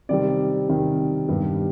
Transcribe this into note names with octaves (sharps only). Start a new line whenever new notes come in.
C3 D#3 G3 C4 D5
C3 D#3 G3 C4
G2 D#3 G3 B3